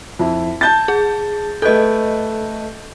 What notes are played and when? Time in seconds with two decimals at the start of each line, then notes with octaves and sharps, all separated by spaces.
0.19 F2 E4
0.61 A5 G6 A6
0.88 G#4
1.62 A3 A4 B4 D#5 G6